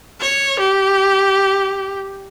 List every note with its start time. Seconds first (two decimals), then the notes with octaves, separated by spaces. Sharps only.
0.20 C#5
0.60 G4